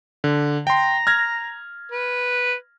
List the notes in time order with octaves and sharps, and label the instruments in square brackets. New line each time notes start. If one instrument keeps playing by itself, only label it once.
[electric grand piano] D3
[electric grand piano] G5 C6 [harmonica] A#5
[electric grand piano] F6 G#6 A#6
[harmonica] B4